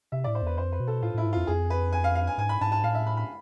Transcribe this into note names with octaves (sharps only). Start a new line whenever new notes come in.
C3 E5
A2 D5
C5
E2 B4
F2 C5
B4
B2
A4
A2 F4
A2 E4
G#2
F2 F4
F2 G#4
B4
G#5
F5
F5
G#5
G#2 G#5
B5
G#2 A5
A5
A2 F5
E5
B5
B5